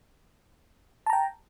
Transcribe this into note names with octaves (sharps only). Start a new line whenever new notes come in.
G5 A5 A#5